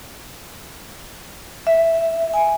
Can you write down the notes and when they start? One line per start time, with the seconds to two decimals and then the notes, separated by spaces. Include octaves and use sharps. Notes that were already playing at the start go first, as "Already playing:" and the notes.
1.67 E5
2.34 G#5